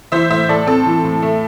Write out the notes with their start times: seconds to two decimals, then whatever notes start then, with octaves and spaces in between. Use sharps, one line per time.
0.12 E3 C5 E5
0.30 A2 C5 E5
0.48 A2 A4 D5
0.67 C4 A4
0.86 E3
1.04 A2
1.22 A3